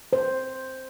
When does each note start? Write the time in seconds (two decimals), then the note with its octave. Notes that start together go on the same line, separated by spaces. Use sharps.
0.13 C5